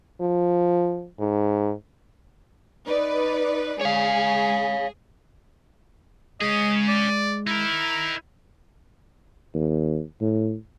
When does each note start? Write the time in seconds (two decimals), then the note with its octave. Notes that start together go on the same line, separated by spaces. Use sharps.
0.21 F3
1.20 G#2
2.87 D#4 B4 D5
3.81 G#3 G#4 C#5 F5
6.41 G#3 C#4 G#4 D#5
6.88 D5
7.47 D#4 E4 A#4
9.54 D#2
10.21 A2